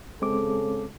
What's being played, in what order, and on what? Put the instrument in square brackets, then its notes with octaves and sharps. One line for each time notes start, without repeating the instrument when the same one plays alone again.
[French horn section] C#3 A4 [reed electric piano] G#3 C4 D6